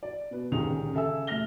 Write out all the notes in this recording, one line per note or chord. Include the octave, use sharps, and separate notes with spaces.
D5
B2 B4
D#1 C#2 D3 D#3 G#4 F7
C#3 A4 E5 G#5 E6
D#1 A3 E5 F6 A#6 G7